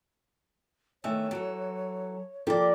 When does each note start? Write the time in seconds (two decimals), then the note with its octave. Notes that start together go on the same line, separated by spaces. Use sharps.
1.04 D#3 E3 A3 C#5 E5
1.31 F#3 A4
2.47 F3 A#3 G4 A4 D5